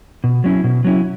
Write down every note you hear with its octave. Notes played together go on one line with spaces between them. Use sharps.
B2
F#3 C#4 E4
B2
F#3 C#4 E4